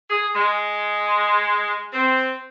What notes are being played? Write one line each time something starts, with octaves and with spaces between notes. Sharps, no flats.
G#4
G#3
C4